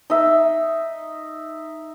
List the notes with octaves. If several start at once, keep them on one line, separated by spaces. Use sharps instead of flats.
D#4 E5